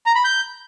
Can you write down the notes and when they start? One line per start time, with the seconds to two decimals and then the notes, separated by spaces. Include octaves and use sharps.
0.06 A#5
0.15 B5
0.25 G6